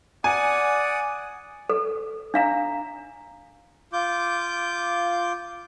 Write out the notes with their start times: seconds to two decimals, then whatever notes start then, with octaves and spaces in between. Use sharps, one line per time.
0.24 D5 F#5 G#5 D#6
1.69 A4
2.34 D4 F5 A#5
3.93 F4 D6 G6